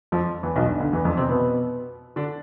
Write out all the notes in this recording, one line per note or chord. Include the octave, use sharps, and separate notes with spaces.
F2 F3
E2 E3
B1 B2
G2
D2 D3
E2 E3
F2 F3
C3 C4
B2 B3
D3 D4